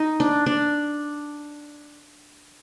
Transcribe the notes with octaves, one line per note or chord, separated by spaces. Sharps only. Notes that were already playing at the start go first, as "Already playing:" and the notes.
Already playing: D#4
D4
D4